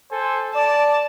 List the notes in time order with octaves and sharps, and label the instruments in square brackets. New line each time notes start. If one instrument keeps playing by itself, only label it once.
[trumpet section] A4 C5 G#5
[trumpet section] D5 [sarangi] A5